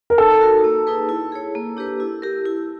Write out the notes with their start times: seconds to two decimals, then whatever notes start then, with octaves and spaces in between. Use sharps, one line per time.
0.10 A#4
0.18 D#4 A4
0.41 F#4 A#4
0.64 A#3
0.87 D#4 G#4 B4
1.09 E4
1.32 G#4 C#5
1.55 A#3
1.77 D4 G4 B4
2.00 E4
2.22 G4 A#4
2.46 E4